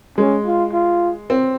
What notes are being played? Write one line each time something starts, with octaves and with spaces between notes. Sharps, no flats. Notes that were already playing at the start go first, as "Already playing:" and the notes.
G#3 C#4
F4
F4
C4